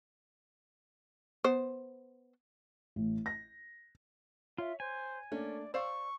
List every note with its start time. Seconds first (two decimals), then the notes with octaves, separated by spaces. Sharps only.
1.44 B3 C5
2.96 A1
3.26 A#6
4.58 F4 C#5 E5
4.80 C5 G#5
5.32 A3 A#3 C#4 D4 D5
5.74 C5 D5 F5 C#6 E6